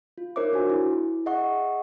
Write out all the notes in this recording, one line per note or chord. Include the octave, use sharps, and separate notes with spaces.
F4
D#4 A#4 C5 C#5 E5 D6
D4 F#4 G#5
E4
G#4 D#5 E5 F#5 C#6